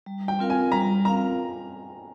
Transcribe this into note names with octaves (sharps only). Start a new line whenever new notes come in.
G3
G5
C4 F4 A#4 F5
G#5
G3 A#5
C4 F4 A#4 F5 A#5